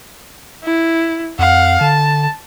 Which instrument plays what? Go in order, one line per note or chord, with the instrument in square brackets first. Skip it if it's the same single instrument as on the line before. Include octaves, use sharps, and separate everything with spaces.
[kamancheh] E4
[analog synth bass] F2 [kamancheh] F5 F#5
[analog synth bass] D3 [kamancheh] A5